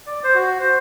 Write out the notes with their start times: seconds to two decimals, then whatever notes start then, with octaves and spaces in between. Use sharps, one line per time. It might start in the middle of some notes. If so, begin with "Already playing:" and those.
0.06 D5
0.24 C5
0.35 F#4
0.60 C5